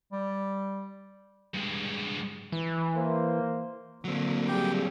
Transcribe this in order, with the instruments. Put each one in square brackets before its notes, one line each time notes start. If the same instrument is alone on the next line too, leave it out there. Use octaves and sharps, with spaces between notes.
[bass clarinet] G3
[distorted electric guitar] G2 G#3
[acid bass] E3
[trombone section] A#3 C5
[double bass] D3 A#3 [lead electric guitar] F#3 C4
[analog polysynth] G3 G#4 [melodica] G4